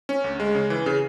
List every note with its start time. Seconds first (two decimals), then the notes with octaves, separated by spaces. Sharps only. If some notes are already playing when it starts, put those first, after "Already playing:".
0.09 C#4
0.24 D2
0.40 G#3
0.55 C#3
0.70 E3
0.86 C#3